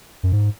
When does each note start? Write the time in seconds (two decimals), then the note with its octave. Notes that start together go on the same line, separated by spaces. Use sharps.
0.23 F#2
0.32 G#2